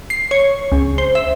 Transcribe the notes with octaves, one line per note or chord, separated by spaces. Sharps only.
C7
C#5
C#2
C5
E5